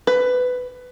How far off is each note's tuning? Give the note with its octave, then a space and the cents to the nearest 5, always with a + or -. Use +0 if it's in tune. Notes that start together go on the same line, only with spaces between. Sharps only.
B4 +15